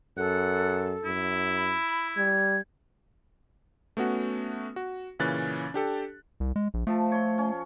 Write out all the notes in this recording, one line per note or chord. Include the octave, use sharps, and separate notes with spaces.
F#2 A4 F#5
F#2 E4
B5
G3 G#6
A3 B3 C#4 F#4
F#4
A#2 C#3 E3 C#4 F#6 A6
D4 G4 A4
C2
G#3
A#1
F3 A3 A4
C#5 C6
C#4